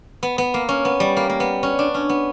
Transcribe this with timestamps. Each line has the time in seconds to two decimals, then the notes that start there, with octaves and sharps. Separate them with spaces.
0.23 B3
0.38 B3
0.54 A#3
0.69 C#4
0.85 B3
1.00 G3
1.17 A#3
1.29 A#3
1.40 B3
1.63 C#4
1.79 D4
1.94 C#4
2.09 B3